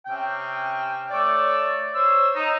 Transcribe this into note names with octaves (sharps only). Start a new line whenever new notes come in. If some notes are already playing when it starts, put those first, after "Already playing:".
C3 C#4 G5
A3 C#5 D5
C5 C#5 E6
D#4